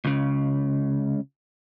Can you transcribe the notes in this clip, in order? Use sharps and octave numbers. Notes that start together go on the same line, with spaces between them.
C#2 C#3